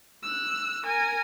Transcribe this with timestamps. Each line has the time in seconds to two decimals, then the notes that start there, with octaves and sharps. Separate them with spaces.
0.23 E6 F#6
0.86 A#4 G#5